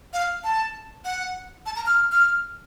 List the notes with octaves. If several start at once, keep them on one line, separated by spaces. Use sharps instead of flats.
F5
A5
F#5
A5
A#5
F6
F6